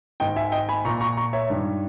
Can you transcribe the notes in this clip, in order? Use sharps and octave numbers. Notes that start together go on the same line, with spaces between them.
G#2 D#3 D#5 G5
E5 G#5
D#5 G5
G#5 B5
A#2 A#5 C#6
A#5 C#6
A#5 C#6
C#5 E5
G2 D#3